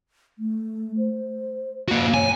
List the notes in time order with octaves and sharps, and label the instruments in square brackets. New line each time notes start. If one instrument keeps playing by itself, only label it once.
[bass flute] A3
C5
[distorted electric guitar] A#3 F#4
[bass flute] C#5 [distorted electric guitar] G#5